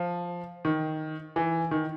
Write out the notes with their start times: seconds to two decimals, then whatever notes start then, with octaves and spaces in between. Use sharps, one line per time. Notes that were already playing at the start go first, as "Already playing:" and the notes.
Already playing: F3
0.65 D#3
1.36 E3
1.71 D#3